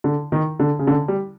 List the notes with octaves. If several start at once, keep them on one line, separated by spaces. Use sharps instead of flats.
D3
D#3
D3
C#3
D3
G3